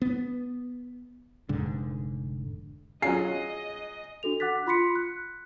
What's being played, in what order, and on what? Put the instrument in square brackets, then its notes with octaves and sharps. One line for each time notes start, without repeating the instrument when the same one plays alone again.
[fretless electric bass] B3
F1 G#2 D3
[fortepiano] F#3 C#4 F4 [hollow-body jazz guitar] G#4 [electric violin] D#5 [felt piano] C7
[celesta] D4 F#4 A4 F7
F#5 D6 F#6 A6 B6
F4 B5 C6 B6 C#7
F#6